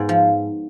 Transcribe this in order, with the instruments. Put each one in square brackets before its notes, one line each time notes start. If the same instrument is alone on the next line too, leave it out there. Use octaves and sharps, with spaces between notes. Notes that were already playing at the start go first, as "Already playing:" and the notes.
Already playing: [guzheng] G#2 B3
F3